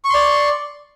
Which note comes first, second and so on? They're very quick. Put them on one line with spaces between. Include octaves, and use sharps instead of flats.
C#6 C6 D5